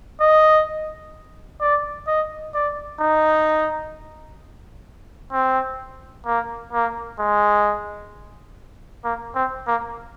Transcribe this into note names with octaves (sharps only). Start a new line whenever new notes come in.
D#5
D5
D#5
D5
D#4
C4
A#3
A#3
G#3
A#3
C4
A#3